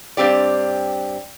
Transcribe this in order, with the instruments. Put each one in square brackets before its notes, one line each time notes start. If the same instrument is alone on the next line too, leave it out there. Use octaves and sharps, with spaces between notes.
[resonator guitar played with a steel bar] G2 C4 G4 D5